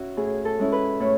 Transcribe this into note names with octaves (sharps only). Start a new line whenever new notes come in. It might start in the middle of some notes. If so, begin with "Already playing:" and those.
Already playing: C#4 E4 F#4
A2 G#4
A4
G#3 C#4 E4
B4
A2 C#5